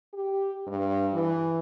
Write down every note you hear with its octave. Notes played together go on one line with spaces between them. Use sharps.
G4
G2
E3